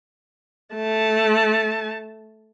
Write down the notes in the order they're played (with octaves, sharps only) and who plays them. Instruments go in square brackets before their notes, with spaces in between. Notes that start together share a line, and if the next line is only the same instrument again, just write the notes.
[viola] A3 A5